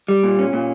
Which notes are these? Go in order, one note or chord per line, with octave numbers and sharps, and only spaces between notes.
G3
A#2
C#4
A#2